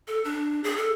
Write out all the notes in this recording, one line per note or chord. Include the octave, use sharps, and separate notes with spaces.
A4
D4
G#4
A4